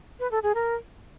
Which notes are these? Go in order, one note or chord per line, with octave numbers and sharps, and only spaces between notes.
B4
A4
G#4
A#4